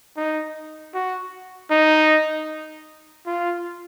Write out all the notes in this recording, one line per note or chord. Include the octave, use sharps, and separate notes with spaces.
D#4
F#4
D#4
F4